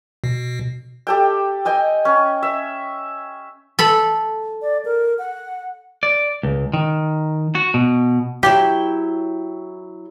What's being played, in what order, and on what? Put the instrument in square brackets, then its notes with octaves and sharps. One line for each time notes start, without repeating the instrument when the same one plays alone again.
[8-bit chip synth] B2
[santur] G4 A4 G5
D#5 G5 G#5
C#4
E5
[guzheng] A4 B5
[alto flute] D5
A#4
F#5
[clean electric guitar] D5
C#2
D#3
F#4
B2
[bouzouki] F#3 E4 G5 [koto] G4